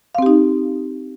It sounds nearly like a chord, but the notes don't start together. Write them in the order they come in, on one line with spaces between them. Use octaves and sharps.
F5 C4 G4 D#4